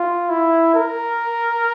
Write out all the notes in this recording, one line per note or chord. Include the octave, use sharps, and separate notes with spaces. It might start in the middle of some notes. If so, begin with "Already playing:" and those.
Already playing: F4
E4
A#4